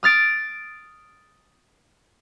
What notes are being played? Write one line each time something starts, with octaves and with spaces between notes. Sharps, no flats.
D#6 F6 A6 D7